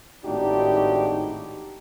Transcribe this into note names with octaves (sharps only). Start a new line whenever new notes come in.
G#1 A2 D4 D#4 F#4 G4